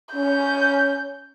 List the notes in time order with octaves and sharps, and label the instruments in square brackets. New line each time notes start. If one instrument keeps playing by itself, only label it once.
[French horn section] C#4 [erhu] G6